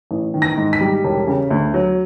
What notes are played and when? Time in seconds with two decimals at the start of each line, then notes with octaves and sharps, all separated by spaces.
0.11 A1
0.34 D#3
0.42 A#6
0.57 G#2
0.73 B6
0.81 G3
1.04 E1
1.27 C#3
1.51 D2
1.74 F#3